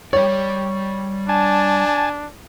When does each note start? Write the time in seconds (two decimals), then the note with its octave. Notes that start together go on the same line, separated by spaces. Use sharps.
0.13 G3 C#5 D5
1.29 D4 G#5 A5